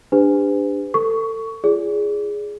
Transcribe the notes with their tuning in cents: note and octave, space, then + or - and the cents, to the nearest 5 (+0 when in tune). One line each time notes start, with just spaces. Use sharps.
D4 +0 G4 +40 B4 +40
A4 +30 C#6 +15
F4 -30 G#4 +0 D5 -35